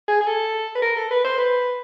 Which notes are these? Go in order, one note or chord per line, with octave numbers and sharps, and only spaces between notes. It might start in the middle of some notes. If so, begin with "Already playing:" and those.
G#4
G#4
A4
B4
A#4
A4
B4
C5
B4